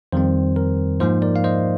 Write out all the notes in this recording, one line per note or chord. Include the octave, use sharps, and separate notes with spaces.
F2 D#3 G3 C4 C5
A#4
G#2 F3 A#3 D#4 C5
A#4 D5
F5
C5 D#5